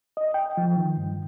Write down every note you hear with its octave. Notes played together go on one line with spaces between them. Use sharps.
D#5
G5
F3
D#3
G2